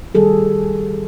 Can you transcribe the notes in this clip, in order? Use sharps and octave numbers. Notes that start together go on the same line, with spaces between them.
D#3 G3 G#4 A4